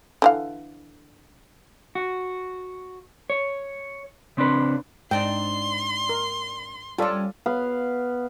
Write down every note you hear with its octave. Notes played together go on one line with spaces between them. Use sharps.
D3 E3 F5
F#4
C#5
C#3 C4 D4 B4
G#2 C4 D4 D#4 G5 C6
A#4
G3 C#4 F4 A4 D5
B3 F5